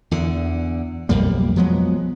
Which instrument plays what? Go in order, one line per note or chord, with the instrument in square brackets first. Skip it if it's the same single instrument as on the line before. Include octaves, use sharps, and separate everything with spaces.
[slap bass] E2 D3
B1 F2 G3 A#3
F3 F#3 G#3 B3